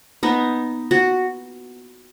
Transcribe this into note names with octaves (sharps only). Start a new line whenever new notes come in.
B3 D#4
F#4